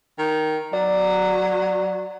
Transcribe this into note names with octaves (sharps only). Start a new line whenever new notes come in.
D#3
F#3 D5